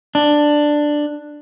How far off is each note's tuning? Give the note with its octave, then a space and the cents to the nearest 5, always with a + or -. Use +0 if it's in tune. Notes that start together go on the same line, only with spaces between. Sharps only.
D4 +10